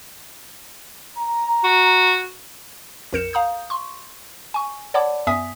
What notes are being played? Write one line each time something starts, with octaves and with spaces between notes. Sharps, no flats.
A#5
F#4
A#1 F2 A#4 G6 C#7 E7
F5 A#5 D#6 G6
C6 C#6
G#5 C#6
C#5 D5 F#5 A5 B5 D6
F#2 B3 E5 G#5 D#6 B6